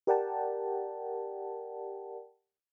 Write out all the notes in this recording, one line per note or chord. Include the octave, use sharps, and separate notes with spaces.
G4 A#4 D5 F#5 G5 A5